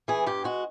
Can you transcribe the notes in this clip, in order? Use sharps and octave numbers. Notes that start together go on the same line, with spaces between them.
E3 G#4
G2 G4
G#3 F#4